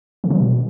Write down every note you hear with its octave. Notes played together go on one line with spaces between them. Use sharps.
C#3
F3
B2